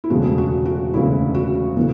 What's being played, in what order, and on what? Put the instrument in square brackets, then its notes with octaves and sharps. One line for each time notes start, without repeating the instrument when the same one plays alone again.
[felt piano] E4
E1 D2 C#3 E3 F#4
F#4
F#4
E1 D2 C#3 E3 E4
F#4
C#3 E3